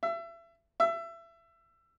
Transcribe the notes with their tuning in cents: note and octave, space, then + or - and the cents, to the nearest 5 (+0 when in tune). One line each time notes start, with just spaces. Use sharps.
E5 +30
E5 +25